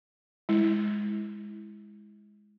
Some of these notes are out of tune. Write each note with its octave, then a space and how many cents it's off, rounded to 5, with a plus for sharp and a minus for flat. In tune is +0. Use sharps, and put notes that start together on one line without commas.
G#3 +0 E4 +0